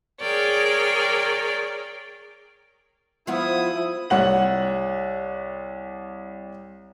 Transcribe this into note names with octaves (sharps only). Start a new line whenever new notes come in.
G#4 A#4 C#5 D5 G5
F3 B3 E4 F4 D#6
C2 C#5 F#5 F#7